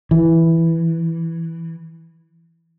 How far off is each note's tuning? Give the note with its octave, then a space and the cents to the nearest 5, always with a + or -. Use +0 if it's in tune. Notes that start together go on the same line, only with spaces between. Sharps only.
E3 +0